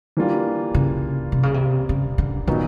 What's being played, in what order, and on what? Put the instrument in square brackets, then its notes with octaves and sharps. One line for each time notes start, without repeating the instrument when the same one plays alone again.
[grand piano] E3 G3 A#3 D4 F4
[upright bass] C#3
C3
C#3
C3
C#3
D3
[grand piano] A#2 F#3 B3 D#4 F#4 [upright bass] D#3